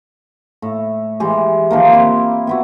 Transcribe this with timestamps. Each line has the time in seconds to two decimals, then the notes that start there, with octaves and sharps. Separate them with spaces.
0.62 A2
1.20 E3 G#3 G4
1.71 D#3 F3 A#3
1.93 C4 E4 C6 D6
2.47 B3 E4 F#4